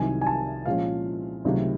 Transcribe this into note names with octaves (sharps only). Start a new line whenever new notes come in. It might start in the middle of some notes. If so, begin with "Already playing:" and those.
Already playing: C2 C3 D#3 F#3 G#5
G#5
A5
A#2 F3 G#3 C#4 F5
C#2 C3 D#3 F#3 A3